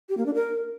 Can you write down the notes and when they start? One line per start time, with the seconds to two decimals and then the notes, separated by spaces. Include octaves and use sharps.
0.09 G4
0.18 A#3
0.26 D4
0.35 A#4